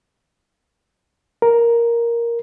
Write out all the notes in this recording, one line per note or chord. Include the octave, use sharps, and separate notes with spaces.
A#4